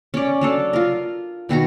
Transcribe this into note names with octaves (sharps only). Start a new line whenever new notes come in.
C#4 D5
F#3 D4 A4
F4 A#4
B2 D#3 F#4 A#5